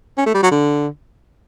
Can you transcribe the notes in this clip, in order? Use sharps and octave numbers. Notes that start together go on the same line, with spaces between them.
C#4
A3
G3
F#3
D3